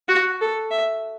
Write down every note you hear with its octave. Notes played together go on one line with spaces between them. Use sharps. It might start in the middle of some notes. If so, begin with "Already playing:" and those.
F#4
A4
E5